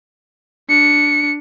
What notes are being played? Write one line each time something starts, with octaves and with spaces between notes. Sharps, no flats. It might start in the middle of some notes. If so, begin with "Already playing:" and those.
D4 C#7